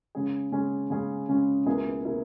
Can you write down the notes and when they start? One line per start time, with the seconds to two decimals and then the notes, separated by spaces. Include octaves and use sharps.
0.15 C#3 G#3 C#4 G#4
0.52 C#3 G#3 C#4 G#4
0.90 C#3 G#3 C#4 G#4
1.28 C#3 G#3 C#4 G#4
1.66 C#2 B2 A#3 E4 G#4
2.05 B2 A#3 E4 G#4